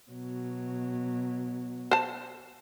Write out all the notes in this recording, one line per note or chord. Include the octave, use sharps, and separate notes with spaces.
B2 F#3
C5 A5